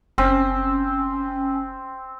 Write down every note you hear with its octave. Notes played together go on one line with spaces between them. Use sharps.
F#1 C4 C#4